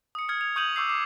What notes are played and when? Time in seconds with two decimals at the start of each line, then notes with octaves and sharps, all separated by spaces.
0.15 D#6 C#7
0.28 D#6 F6 G#6 C#7
0.41 F7
0.56 C#6 D#6 G6 D#7 F7 F#7
0.76 C#6 D6 E6 G6 C7
0.89 D6